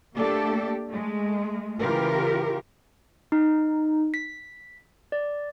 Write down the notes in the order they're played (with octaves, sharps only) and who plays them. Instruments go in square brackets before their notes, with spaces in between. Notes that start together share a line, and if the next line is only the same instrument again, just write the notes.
[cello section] A3 A#3 D4 G4 A4
G#3 A3
C#3 E3 F4 G4 A#4
[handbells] D#4
B6
D5